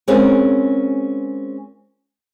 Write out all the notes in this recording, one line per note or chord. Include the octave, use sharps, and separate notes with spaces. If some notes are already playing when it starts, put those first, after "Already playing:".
G#3 C4 C#4 F4 G#4 A#4